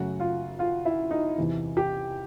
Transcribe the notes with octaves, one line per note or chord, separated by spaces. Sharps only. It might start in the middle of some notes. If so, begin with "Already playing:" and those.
Already playing: F#2 C#3 F#3 A3 F#4 F#5
F4 F5
F4 F5
E4 E5
D#4 D#5
E2 C3 E3
G4 G5